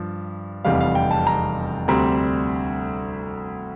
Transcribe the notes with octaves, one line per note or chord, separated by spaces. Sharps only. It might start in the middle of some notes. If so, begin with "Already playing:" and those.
Already playing: G2 F3
F1 E2 C3 G3 F5
F5
G5
A5
A#5
D2 C3 G3 C4 A#5